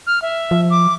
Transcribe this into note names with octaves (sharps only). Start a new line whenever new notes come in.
F6
E5
F3
D6